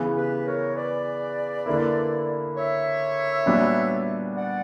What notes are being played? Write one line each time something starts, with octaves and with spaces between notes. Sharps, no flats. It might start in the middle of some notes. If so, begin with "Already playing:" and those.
Already playing: C#3 E3 B3
G4 B4
A#4 C#5
B4 D5
D3 A#3 E4
C#5 E5
A#2 G3 B3 D4 F#4
D5 F#5